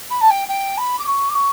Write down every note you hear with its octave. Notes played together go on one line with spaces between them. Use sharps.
B5
A5
G5
G5
B5
D6
C#6
D6
C#6